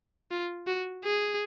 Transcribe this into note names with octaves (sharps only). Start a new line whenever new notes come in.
F4
F#4
G#4